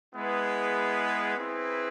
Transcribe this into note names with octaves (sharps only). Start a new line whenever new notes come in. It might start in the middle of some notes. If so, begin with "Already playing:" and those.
G#3 B3 E4 G#4 B4
C4 E4 G#4 B4